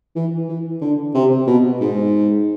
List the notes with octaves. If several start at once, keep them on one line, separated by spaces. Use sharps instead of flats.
E3
E3
D3
C3
B2
G#2